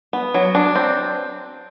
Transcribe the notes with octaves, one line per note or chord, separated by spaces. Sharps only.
B3
F#3
D4
C4